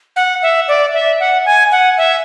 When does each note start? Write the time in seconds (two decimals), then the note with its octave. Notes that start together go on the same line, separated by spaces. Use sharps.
0.16 F#5
0.42 E5
0.68 D5
0.94 E5
1.20 F#5
1.46 G#5
1.72 F#5
1.98 E5